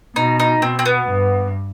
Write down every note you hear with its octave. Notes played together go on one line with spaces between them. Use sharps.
B2 D#4
D#4
B2 C4
C4
B3
G2